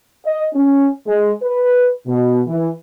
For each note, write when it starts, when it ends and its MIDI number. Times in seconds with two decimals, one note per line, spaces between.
0.25 0.45 75
0.55 0.88 61
1.07 1.32 56
1.43 1.90 71
2.07 2.42 47
2.47 2.69 52